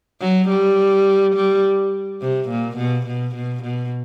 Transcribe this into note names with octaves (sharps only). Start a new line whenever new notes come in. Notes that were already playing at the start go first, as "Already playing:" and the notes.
F#3
G3
G3
C3
A#2
B2
B2
B2
B2